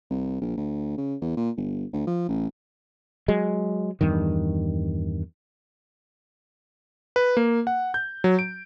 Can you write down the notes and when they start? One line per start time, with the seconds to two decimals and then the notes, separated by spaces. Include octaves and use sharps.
0.10 C2
0.41 A#1
0.57 D2
0.97 C#3
1.21 E2
1.37 A#2
1.57 G1
1.93 D2
2.07 F3
2.28 A1
3.28 F#3 G#3
4.01 E2 G2 D#3
7.16 B4
7.37 A#3
7.67 F#5
7.94 G6
8.24 F#3
8.39 D7